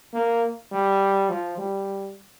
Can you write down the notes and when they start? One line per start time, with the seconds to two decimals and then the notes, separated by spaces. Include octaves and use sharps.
0.14 A#3
0.71 G3
1.29 F3
1.57 G3